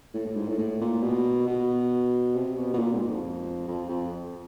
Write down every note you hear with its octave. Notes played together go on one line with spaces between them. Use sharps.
A2
A2
G#2
A2
A2
A#2
B2
B2
C3
B2
B2
A#2
G#2
F2
F2
F2